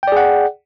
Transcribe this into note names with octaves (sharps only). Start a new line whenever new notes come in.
G#4 D5 F#5 G5